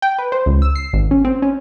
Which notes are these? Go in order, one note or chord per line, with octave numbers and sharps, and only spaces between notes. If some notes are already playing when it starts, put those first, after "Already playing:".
G5
B4
C5
C#2
E6
C7
G#1
C#4
C4
C#4